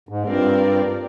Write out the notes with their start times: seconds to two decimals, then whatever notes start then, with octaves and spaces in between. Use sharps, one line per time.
0.09 G#2
0.24 G2 C4 F4 A#4 D5